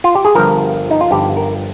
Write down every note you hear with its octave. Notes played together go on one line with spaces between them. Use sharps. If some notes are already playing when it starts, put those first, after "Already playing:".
F4
G4
G#4
G1 G2 F3 A#4
D#4
F4
G1 G2 F3 G4
A#4